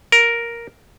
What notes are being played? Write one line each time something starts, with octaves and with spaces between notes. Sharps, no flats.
A#4